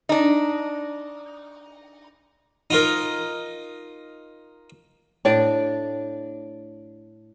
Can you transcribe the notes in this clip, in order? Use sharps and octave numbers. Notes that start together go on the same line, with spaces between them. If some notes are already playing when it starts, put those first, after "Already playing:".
D4 D#4
D#4 F4 A#4
A2 D4 D5